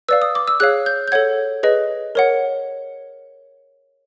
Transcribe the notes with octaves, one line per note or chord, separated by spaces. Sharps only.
B4 D5 F5 E6
D#6
D6
E6
G#4 C#5 F5 F#6
G6
G6
A4 C#5 F#5 G#6
G#4 B4 D#5
A#4 C#5 F#5